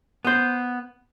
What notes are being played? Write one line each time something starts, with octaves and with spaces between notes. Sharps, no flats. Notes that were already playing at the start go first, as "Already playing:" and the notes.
B3 C5